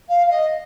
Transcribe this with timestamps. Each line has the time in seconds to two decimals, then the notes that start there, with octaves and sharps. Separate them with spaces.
0.08 F5
0.26 F5
0.30 D#5